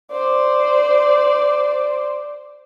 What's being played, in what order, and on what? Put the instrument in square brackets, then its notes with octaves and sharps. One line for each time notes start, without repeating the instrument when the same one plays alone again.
[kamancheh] C5 D5